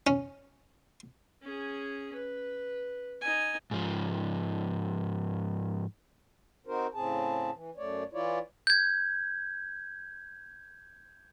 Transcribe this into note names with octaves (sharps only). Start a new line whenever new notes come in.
C#4
C#4 G#4
B4
D#4 G#5
G#2 F3
C4 D#4 F#4 A#4 C5
A2 C#3 C4 G#4 A5
E3
F#2 A3 C#5 D5
E3 E4 F4 C#5 D5
G6 G#6